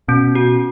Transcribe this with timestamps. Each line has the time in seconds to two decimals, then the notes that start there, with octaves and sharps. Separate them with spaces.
0.08 B2 C#4
0.35 F#4